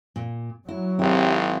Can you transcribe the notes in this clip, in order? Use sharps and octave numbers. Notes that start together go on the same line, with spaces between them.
A#2
F#3 E4
G#1 C3 E4